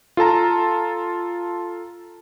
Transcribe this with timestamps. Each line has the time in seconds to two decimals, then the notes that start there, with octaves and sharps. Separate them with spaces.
0.17 F4 A4 A5 A#5